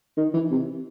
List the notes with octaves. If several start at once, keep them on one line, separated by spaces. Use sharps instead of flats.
D#3
E3
C3